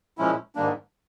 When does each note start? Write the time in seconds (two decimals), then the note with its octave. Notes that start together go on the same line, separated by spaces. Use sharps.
0.18 A#2 F3 G#3 C#4 E4
0.55 G#2 D#3 G3 A#3 D4